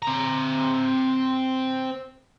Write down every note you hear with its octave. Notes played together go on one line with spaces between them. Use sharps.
C4 A#5